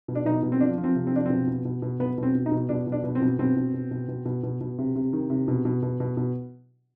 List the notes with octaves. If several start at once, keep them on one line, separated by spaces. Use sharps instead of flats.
B2
D4
B2 D#4
B2
C4
F3 D4
F3
C4
C3
C4
F3 D4
B2 C4
B2
B2
B2
B2 B3
B2 C4
B2
D#4
B2
B2 D4
B2
D4
B2
C4
B2
B2 C4
B2
B2
B2
B2
B2
B2
B2
C3
C3
D#3
C3
B2
B2
B2
B2
B2